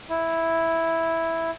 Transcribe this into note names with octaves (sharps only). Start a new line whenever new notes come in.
E4